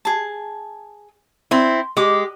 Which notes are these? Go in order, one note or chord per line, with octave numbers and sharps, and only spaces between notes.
G#4 A5
C4 E4 C6
G#3 G4 D6 D#6